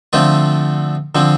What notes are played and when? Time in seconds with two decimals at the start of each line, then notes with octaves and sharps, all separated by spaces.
0.13 D3 F3 A3 C4 F4
1.15 D3 F3 C4